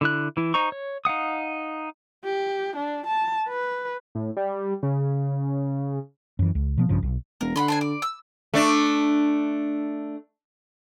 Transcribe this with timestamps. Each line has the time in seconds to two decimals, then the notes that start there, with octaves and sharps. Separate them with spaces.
0.01 D3 E4 F#6
0.37 E3 E4
0.54 D#4 C5 A#5 C#6
0.72 C#5
1.05 D#4 F5 F#5 D#6
2.25 G4
2.76 D4
3.07 A5
3.49 B4
4.15 A2
4.37 G3
4.83 C#3
6.39 F#2 E3
6.55 C#2
6.78 B2 F3 B3
6.89 A#1 G2 C#3 F3
7.02 B1
7.41 E1 A#4
7.56 D3 F#5 B5 C6
7.68 D4 C5 G#5
7.81 D5
8.02 E6
8.54 A3 D4